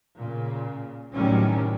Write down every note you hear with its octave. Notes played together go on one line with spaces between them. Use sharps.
A#2 C#3
A2 C3 D#3 F#3 G3 C#4